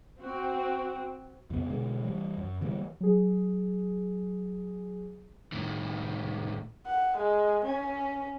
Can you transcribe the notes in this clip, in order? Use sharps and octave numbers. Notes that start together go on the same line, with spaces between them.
C4 F#4
F2 C#3 B3
B2 D3 G#3
E3 F#3 G3
F#2
D3 E3 G3 A#3
F#3 G#4
A2 D#3
F#5
G#3
C#4